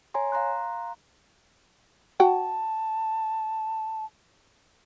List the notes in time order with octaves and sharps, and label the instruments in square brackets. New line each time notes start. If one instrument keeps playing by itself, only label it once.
[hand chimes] C#5 G#5 A#5 C6
F5 A#5 C6 F#6
[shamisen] F#4 F#5 G5 [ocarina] A5